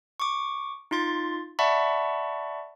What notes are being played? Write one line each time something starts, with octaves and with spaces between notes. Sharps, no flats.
C#6 D6
D#4 F4 C6 A6
D5 E5 F#5 A5 B5 C#6